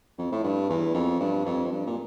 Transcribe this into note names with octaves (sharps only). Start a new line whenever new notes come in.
F2
A2
G2
E2
F2
G2
F2
F2
G2
A#2